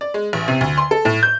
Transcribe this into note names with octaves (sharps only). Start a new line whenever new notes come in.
D5
G#3
A1
C3
D2
C6
A4
A2
G6